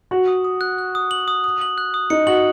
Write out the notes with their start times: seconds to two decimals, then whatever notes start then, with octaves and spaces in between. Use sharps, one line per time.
0.11 F#4 F#7
0.28 D#6
0.45 D#6
0.61 F#6
0.78 F#6
0.95 D#6
1.11 F#7
1.28 D#6
1.44 D#6
1.61 F#7
1.78 F#6
1.94 D#6
2.10 D#4 C#7
2.27 F#4 F#7